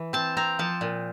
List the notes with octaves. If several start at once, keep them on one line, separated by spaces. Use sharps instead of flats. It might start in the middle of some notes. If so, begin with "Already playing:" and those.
Already playing: E3
C4 A5
C4 A#5
F3 A5
A#2